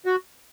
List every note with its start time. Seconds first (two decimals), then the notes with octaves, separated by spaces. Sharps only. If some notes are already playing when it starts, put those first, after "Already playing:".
0.06 F#4